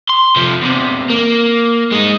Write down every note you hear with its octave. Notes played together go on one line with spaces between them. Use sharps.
C6
C3 F3
E2 C3
A#3
G#3 D#4